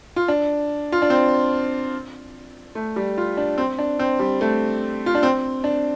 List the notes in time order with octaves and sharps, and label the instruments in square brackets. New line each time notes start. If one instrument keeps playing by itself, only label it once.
[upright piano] F4
D4
F4
D4
C4
A3
G3
F4
D4
C4
D4
C4
G3
A3
F4
D4
C4
D4